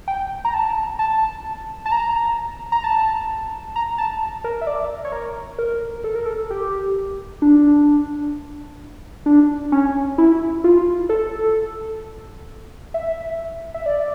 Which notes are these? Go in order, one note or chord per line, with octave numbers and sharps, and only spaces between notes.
G5
A#5
A5
A5
A5
A#5
A#5
A5
A#5
A5
A#4
E5
D5
C#5
A#4
A#4
A4
A#4
A4
G4
D4
D4
C#4
E4
F4
A4
E5
E5
D5